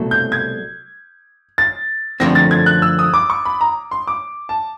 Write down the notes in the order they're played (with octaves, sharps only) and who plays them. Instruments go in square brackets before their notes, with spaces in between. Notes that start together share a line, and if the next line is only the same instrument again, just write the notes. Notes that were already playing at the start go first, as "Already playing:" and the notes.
Already playing: [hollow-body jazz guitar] C2 B2 F#3 A3
[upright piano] G6
G#6
A6
[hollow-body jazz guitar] F#2 D3 F3 A3 C4 [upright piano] A#6
[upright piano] A6
G#6
F#6
E6
D#6
D6
C#6
B5
A#5
C6
D6
A5